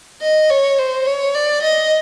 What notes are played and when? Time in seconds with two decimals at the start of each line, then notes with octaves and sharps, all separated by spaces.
0.22 D#5
0.50 C#5
0.79 C5
1.07 C#5
1.35 D5
1.63 D#5